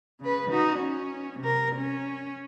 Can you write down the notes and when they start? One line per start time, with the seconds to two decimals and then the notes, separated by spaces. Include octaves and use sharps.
0.21 C#3 B4
0.51 D#4 F#4
0.80 C#4
1.40 C3 A#4
1.76 C#4